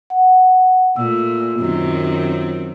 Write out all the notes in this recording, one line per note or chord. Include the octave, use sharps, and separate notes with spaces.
F#5
A#2 A3 F4 E6
F#2 D#3 C4